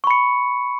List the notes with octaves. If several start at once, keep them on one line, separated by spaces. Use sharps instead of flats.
B5 C#6 C#7